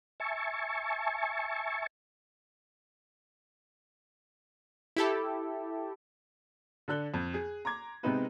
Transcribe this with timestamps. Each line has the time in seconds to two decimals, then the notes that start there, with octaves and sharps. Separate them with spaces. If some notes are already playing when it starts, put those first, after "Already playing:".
0.20 E5 G#5 A5 C#6
4.96 E4 G4 A4
6.88 D3 D4 A4 F#6 G7
7.14 F2
7.34 G#4
7.65 A#5 C6 D6 G#6
8.03 C3 G#3 B3 C4 D#4 B4